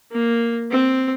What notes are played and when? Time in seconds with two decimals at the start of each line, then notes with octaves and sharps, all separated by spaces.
0.12 A#3
0.71 C4